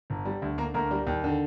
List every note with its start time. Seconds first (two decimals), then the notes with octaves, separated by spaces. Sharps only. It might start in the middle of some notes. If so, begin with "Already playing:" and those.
0.10 G1
0.25 G3
0.42 D2
0.58 D3 A#3 A#4
0.74 D2 A#3 A#4
0.91 G3
1.07 D#2
1.24 D3